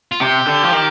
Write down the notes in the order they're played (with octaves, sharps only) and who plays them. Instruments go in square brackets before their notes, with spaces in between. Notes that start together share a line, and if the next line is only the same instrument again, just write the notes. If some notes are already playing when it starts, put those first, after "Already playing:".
[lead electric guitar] F4
[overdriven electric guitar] C3 [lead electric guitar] G4
[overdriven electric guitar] D3
F3
D#3